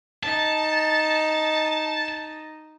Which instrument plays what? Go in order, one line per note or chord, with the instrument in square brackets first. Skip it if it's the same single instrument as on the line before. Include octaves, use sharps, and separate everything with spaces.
[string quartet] D#4 [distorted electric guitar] A5